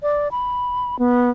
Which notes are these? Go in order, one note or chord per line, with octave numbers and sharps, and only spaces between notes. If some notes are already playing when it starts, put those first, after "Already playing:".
D5
B5
B3